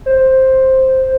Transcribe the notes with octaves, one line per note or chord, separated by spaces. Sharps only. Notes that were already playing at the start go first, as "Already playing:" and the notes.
C5